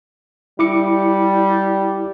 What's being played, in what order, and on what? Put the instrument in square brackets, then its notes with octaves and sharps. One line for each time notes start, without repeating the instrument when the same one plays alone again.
[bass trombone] G3 [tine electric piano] E4 D6 C#7